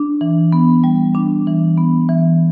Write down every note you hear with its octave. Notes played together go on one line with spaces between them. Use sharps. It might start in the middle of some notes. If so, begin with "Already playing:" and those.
Already playing: D4
E3
B3
G3
D4
E3
B3
E3